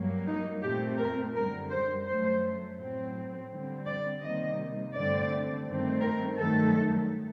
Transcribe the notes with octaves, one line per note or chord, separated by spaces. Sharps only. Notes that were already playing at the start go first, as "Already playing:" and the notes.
Already playing: G2 F#3 A#3
D#4
A#2 A3 C4 G4
A#4
F#2 D3 G3 A#4
C5
F#2 F#3 A3 C5
A2 F#3 C4
D3 G3 C4
D5
C3 D#3 G3 A#3 D#5
G2 D3 A3 C4 D5
G2 D#3 A3 C4
A#4
G2 D#3 F#3 A3 A4